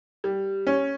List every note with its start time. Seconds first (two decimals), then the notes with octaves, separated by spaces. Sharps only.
0.24 G3
0.67 C#4